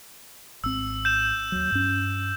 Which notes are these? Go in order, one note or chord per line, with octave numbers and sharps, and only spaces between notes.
G#1 C4 E6
G6 E7
D#2 F#3
G2 C#4